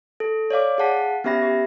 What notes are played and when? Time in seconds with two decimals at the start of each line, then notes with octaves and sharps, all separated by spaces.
0.20 A4
0.51 C#5 D5 F5 D6
0.78 G#4 F5 F#5 A5 B6
1.24 B3 C#4 G4 E5 B5 A#6
1.42 G4